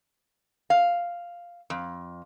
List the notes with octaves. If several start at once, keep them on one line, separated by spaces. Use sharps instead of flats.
F5
F2